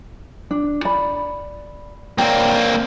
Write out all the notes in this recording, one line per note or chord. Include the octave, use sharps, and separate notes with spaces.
D4
D5 B5
A#3 C4 C#5 D5 G5